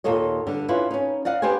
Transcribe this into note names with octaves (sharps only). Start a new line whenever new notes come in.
D#2 A#2 F4 A4 C#5 D#5
G2 D3
C#4 D4 E4 F4 B4
C#4 D#4
D5 D#5 F5 F#5
B3 D4 G4 B4 C5 G#5